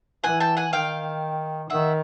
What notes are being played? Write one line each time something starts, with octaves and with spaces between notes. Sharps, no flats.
E3 F#5 G#5
G5 A5
F#5 G#5
D#3 F5 G5
D#3 E5 F#5